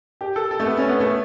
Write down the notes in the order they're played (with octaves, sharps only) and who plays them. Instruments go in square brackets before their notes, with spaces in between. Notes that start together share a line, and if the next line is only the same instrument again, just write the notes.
[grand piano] G4
A4
A4
A3
B3
C#4
B3
A3